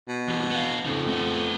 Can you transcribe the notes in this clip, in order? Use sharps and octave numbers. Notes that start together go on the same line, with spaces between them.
B2
E3 G3
B3 F5
F2 C#3 D#4
A3 B3